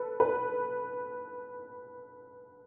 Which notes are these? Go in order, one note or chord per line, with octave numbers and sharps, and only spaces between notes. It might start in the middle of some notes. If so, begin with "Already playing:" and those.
Already playing: A4 B4
B4